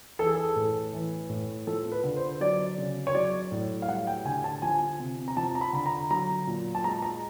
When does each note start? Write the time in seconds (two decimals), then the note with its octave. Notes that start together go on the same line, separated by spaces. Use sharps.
0.19 E3 A4
0.26 G#4
0.34 A4
0.56 A2
0.93 E3
1.29 A2
1.67 F3 A4
1.92 B4
2.04 D3
2.16 C5
2.41 F#3 D5
2.78 C#3
3.07 C#5
3.14 F#3 D5
3.52 A2
3.82 F5
3.88 G3 F#5
4.07 G5
4.25 D3 G#5
4.44 A5
4.62 F3 G#5
4.99 C3
5.28 A#5
5.37 F3 A5
5.55 A#5
5.61 B5
5.73 D3 B5
5.86 A#5
6.11 F#3 A#5
6.47 A#2
6.75 A5
6.84 G#3 A#5
7.02 A#5